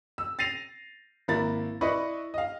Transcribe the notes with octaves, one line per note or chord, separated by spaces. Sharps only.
E6
A6 A#6 C7 D#7 F7
G#1 A#3 E4 A#5 B5 A6
E4 B4 D5 D#5 B5 C#6
D#5 F5